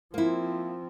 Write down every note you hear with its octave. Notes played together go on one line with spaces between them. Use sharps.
F3 A#3 C4 E4